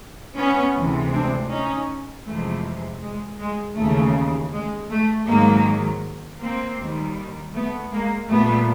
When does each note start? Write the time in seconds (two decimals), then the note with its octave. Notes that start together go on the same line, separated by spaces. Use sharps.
0.38 B3 C#4
0.76 D2 C3 E3 G#3
1.13 C4 D4
1.51 C#4 D#4
2.26 F2 C3 E3 G#3 A3
3.02 G#3
3.40 G#3
3.77 D#2 C#3 E3 A3
4.53 G#3
4.91 A3
5.28 G#2 D#3 F#3 G#3 A#3
6.42 A#3 C4
6.79 D#2 D#3 G3
7.54 A3 B3
7.92 G#3 A#3
8.30 A#2 G3 A3 B3